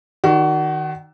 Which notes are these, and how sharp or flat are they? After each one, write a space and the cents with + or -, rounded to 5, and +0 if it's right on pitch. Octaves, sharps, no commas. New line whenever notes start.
D#3 -5 F#4 +25 D5 +0